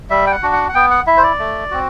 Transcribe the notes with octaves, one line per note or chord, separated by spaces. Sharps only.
G3 E5
G5
F#5
D4 F#4
F#5
F#5
B3 G5
F#5
E4 E5
C5
D5
A3
C4 F#4